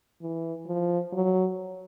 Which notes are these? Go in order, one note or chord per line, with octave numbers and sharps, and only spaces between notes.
E3
F3
F#3